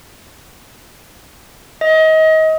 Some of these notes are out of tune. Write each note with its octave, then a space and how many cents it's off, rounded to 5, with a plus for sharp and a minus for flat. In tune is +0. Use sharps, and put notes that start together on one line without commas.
D#5 +30